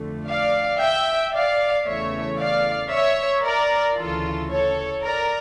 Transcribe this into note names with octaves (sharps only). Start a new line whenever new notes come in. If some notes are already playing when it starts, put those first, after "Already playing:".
Already playing: F2 D3 A3
D5 F5
E5 G5
D5 F5
E2 C#3 E3 A3 C#5 E5
D5 F5
C#5 E5
A#4 D5
D2 C#3 E3 F4 A4
A4 C#5
A#4 D5